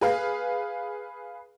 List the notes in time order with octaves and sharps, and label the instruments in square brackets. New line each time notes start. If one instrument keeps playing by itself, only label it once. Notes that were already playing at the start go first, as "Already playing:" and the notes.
[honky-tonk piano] G#4 B4 F5